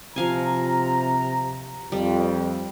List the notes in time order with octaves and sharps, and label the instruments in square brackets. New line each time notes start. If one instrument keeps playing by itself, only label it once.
[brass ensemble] C3 A#5 [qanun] F3 F5 G#5
[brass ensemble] F2 [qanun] G3